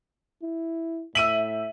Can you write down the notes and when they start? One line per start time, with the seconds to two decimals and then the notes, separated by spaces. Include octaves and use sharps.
0.42 E4
1.15 A2 E5 E6 D#7 F#7